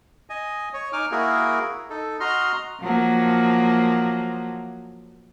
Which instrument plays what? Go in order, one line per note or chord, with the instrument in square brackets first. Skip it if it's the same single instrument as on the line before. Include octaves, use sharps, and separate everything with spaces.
[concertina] D#5 G#5
C#5
D#4 G#5 D6 F6
A#3 E4 F#4 G#4 A#4
D#4 A4
F#4 D#5 A#5 C6 F6
[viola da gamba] F3 F#3 A#3